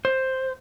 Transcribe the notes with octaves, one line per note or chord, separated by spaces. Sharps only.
C5